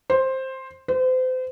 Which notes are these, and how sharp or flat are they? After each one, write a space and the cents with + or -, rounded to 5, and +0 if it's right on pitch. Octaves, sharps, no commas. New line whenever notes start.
C5 +10
C5 -35